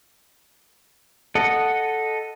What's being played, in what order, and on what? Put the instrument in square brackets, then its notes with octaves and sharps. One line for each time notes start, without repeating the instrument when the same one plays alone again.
[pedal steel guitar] A4 D#5 F#5